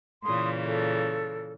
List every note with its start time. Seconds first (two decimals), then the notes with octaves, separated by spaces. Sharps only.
0.24 A#2 C#3 E3 C6 D#6
0.64 A4